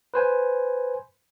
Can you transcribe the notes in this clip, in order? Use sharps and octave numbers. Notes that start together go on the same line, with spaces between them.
B4 C5 G#5